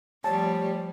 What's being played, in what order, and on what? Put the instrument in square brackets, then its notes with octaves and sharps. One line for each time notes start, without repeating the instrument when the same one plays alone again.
[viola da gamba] F3 G3 [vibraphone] A3 G4 D5 [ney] C#5 [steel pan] A5